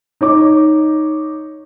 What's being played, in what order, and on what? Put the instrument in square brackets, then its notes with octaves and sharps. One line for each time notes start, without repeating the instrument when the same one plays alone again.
[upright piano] D#4 C#5 D6